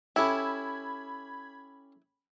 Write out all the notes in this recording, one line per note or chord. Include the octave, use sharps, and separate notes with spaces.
C#4 E4 G4 A4 B5 G#6